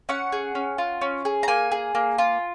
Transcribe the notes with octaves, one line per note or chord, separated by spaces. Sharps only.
C#4 F#5
G#4
C#4
F4
C#4
G#4
A#5
A#3 G#5
G#4
A#3
F4